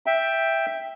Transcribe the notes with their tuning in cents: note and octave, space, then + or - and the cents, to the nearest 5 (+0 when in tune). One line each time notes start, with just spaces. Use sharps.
E5 +0 G5 +5